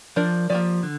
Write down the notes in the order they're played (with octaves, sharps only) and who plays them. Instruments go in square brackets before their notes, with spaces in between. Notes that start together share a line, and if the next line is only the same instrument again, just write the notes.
[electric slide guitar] F3 [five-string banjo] D4 A#4 D5
[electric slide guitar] F3 [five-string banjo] A#3 G4 D5
[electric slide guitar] D3